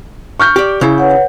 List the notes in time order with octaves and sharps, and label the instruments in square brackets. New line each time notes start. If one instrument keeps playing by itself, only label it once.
[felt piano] C#6 F6 G6
[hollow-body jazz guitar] G4 D5
C#3 E4
[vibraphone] B4 C#5 F#5